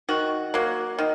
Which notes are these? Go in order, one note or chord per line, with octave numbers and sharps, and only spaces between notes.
D#3 F#4
F#3 A#3
D#3